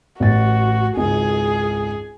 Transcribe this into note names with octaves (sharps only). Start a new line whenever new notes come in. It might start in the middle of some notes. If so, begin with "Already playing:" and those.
A1 F#4 A6
G#1 C#2 G#2 G#4